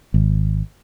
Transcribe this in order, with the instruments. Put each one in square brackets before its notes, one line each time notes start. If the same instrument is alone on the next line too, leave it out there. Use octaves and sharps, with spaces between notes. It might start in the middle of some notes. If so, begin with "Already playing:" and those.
[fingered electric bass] G#1